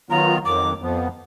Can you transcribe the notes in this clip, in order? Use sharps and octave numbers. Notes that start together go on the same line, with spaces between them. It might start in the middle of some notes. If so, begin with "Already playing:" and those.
D#3 F#3 B3 F4 A#5
F2 D#3 F#3 D6
F2 F3 B3